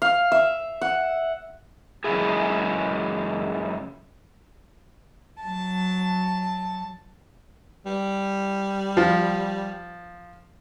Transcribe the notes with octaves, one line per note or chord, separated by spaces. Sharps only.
F5
E5
F#5
F#2 C#3 F3 G#3 E4 G#4
F#3 A5
G3
F3